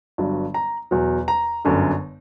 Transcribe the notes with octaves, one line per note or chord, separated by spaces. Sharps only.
G1 G2 F#3
A#5
E2 B2 F#3
A#5
G1 F#2 D3